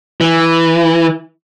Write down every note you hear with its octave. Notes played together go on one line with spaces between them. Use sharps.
E3